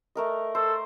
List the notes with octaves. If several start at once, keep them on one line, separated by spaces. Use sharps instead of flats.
A3 A#4 D#5
A4 C5